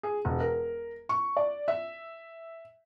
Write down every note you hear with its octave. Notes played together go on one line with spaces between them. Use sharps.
G#4
E1
A#4
C#6
D5
E5